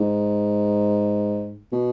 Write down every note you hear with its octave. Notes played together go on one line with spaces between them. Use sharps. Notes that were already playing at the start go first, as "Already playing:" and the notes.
Already playing: G#2
B2